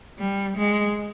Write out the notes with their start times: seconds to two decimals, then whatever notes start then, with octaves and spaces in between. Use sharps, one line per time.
0.18 G3
0.57 G#3